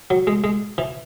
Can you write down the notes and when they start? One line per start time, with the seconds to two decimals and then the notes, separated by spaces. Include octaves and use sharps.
0.10 F#3
0.27 G#3
0.44 G#3
0.78 E3